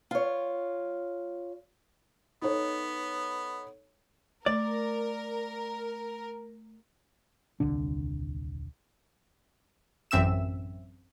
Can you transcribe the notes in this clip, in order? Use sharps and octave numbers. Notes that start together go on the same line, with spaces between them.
F4 C#5
B3 D#4 A4 C#5
A3 A#4 D5
D#1 C2 D3 D4
A1 F#2 C4 E5 E6 E7